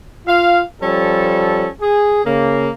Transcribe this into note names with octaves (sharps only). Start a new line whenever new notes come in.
F4 F5
F3 G3 C#4 A4
G#4
C#3 A#3